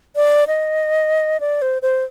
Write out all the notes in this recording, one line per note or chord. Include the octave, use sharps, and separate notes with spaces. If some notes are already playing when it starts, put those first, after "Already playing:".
D5
D#5
D5
C5
C5